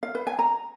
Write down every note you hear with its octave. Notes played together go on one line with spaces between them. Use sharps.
F5
B4
G#5
A#5